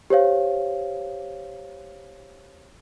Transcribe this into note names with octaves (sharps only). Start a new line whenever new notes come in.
G4 C5 C#5 F5